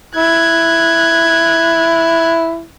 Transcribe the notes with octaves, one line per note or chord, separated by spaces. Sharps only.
E4 F#6 G#6